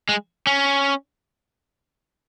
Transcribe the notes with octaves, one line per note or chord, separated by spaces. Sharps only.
G#3
C#4